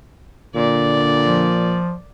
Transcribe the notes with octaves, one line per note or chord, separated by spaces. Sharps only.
A#2 D3 D5
F3